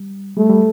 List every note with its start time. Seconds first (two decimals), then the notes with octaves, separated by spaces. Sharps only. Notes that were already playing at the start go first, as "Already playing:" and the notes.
Already playing: G3
0.37 G3 A3
0.50 G3